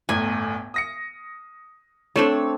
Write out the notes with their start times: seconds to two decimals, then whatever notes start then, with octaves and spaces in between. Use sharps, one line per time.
0.09 G1 E2 A2 G#5
0.74 D#6 A#6 C#7
2.16 A3 C4 D4 C#5